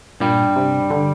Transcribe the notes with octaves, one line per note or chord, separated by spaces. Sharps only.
G2 A#2 G3
C3
D3